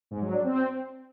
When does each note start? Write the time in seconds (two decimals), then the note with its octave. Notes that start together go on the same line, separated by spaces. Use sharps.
0.11 G#2
0.22 F#3
0.33 D4
0.44 C4